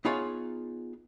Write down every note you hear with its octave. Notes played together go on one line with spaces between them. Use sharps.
B3 D#4 F4 G#4 C#5 F5